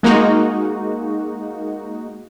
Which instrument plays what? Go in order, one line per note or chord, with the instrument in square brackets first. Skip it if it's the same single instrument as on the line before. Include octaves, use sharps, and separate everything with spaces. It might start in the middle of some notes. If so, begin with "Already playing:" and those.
[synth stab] G#3 A#3 D#4 F#4